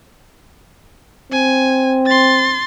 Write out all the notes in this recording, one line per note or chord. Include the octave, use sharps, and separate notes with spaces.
C4 G#5
C6 A6